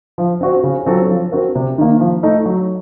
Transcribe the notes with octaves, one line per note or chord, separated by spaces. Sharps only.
F3
C4 F#4 C5
C#3
F#3 C4 F4 A4
F3
C4 F#4 A#4
C3
D#3 A#3
F3
A3 D#4 A4
F#3